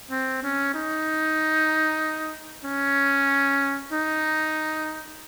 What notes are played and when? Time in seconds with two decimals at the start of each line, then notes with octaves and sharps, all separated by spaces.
0.10 C4
0.43 C#4
0.74 D#4
2.64 C#4
3.92 D#4